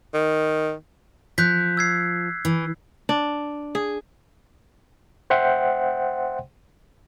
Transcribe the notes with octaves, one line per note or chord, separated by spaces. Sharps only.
D#3
F3 F#6 G6 B6
E6 G#6 C7
E3
D4
G#4
C5 E5 F#5 G5 C6